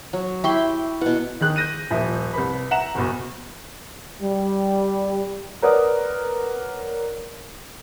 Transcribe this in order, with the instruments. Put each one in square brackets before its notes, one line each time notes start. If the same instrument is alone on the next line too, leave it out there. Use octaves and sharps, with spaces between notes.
[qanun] F#3
[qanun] E4 G4 C6 [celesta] E5 G5 C#6
[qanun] B2 F#5 [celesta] E4 B4
[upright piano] D#3 G#4 F#6
G6 A#6 D#7
D#1 F3 E5
C2 B4 B5
E5 F#5 A#5 E7
F#1 B1
[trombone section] G3
[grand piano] A#4 B4 C#5 D5 F#5 D#6